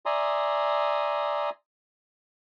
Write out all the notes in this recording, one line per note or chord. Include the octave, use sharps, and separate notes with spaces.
D5 E5 G#5 A#5 C6 D#6